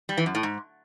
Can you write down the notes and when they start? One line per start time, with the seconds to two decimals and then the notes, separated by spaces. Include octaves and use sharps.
0.09 G3
0.17 E3
0.26 F#2
0.35 A2
0.43 G#2